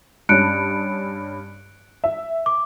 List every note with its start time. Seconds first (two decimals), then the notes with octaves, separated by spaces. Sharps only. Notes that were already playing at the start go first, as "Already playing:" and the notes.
0.29 G2 C#4 F#6 C#7 D7
2.04 E5
2.46 D6